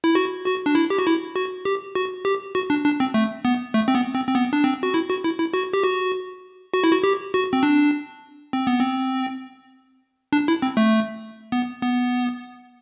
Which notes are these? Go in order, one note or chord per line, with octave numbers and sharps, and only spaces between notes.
E4
F#4
F#4
D4
E4
G4
F#4
E4
F#4
G4
F#4
G4
F#4
D4
D4
C4
A3
B3
A3
C4
B3
C4
C4
B3
D4
C4
F#4
E4
F#4
E4
E4
F#4
G4
F#4
F#4
E4
F#4
G4
F#4
C4
D4
C4
B3
C4
D4
E4
C4
A3
B3
B3